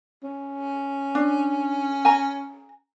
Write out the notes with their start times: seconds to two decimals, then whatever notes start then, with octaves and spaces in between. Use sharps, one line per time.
0.24 C#4
1.15 D4
2.05 G#5 A#5